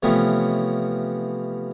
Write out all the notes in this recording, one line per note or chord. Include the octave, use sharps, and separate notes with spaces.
C3 E3 F3 A3 B3 C#4